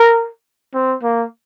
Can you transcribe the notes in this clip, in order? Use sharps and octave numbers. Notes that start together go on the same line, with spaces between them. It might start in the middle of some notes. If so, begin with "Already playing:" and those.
Already playing: A#4
C4
A#3